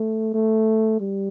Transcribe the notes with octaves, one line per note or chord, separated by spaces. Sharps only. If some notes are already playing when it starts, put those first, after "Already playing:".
Already playing: A3
A3
G3